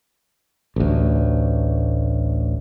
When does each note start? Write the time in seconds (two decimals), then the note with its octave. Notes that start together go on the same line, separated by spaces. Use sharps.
0.76 A1 D2